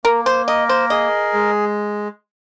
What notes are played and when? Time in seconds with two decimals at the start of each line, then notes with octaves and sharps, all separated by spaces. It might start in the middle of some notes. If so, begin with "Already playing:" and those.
0.05 A#3 A#4
0.26 C5
0.47 A#4 D#5
0.69 C5
0.90 G#4 D#5
1.34 G#3